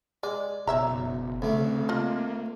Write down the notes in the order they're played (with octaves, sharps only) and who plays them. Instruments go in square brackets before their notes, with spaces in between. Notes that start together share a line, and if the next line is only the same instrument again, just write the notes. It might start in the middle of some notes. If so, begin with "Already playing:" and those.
[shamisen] G#3 [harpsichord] D5
[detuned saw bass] F#1 [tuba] B2 [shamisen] C#5 E5 A#5
[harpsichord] D2 A3 [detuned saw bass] C#3 [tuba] C4
[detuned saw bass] A#3 [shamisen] F4 D#5